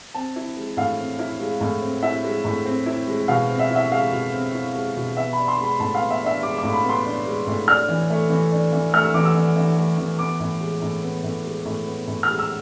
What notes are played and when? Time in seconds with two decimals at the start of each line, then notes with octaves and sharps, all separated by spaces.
0.14 C4 A5
0.36 E4
0.57 G#3
0.77 A2 F5
0.98 C4
1.19 E4
1.40 G#3
1.61 A2
1.82 C4
2.03 E4 E5
2.24 G#3
2.45 A2
2.65 C4
2.86 E4
3.07 G#3
3.28 B2 F5
3.49 C4
3.59 E5
3.70 E4
3.75 E5
3.91 G#3 F5
4.12 B2
4.33 C4
4.54 E4
4.75 G#3
4.96 B2
5.17 B3 E5
5.33 D4 B5
5.48 C6
5.59 G#3 B5
5.80 A2 A5
5.95 F5
6.00 B3
6.10 E5
6.22 D4 E5
6.43 G#3 D6
6.58 A2 D6
6.73 B5
6.84 B3
6.89 C6
7.05 D4
7.26 G#3
7.47 A2
7.68 D4 F6
7.89 E3
8.10 A3
8.30 E3
8.52 D4
8.73 E3
8.93 A3 F6
9.04 E6
9.14 E3 D6
9.25 E6
9.35 D4
9.56 E3
9.78 A3
9.98 E3
10.19 B3 D6
10.40 A2
10.61 G#3
10.82 A2
11.03 B3
11.24 A2
11.44 G#3
11.66 A2
11.86 B3
12.08 A2
12.23 G#3 F6
12.39 E6